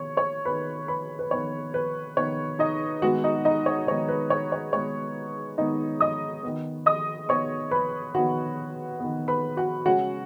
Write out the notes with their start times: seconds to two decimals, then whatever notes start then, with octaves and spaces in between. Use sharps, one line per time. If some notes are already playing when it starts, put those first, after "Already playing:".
Already playing: D#3 B3 C#5 C#6
0.17 C#5 C#6
0.45 D#3 B3 B4 B5
0.88 B4 B5
1.19 B4
1.31 D#3 B3 C#5
1.74 B4
2.17 D#3 B3 C#5
2.59 D#4 D#5
3.02 D#3 G#3 B3 F#4 F#5
3.24 D#4 D#5
3.45 D#4 D#5
3.66 C#5
3.87 D#3 G#3 B3 C#5
4.09 B4
4.30 C#5
4.52 C#5
4.73 D#3 G#3 B3 C#5
5.58 D#3 G#3 B3 D#4 D#5
6.01 D#5 D#6
6.43 D#3 B3
6.86 D#5 D#6
7.29 D#3 B3 C#5 C#6
7.71 B4 B5
8.14 D#3 B3 F#4 F#5
9.00 D#3 B3
9.28 B4 B5
9.57 F#4 F#5
9.86 C#3 G#3 C#4 F#4 F#5